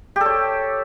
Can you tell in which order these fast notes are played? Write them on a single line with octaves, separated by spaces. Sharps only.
G4 A4 C#5